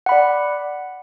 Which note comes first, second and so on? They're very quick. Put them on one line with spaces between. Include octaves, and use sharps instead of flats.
F#5 B5 D5